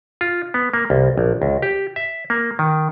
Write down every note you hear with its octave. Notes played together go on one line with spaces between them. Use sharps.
F4
B3
A#3
C2
A#1
C#2
G4
E5
A#3
D#3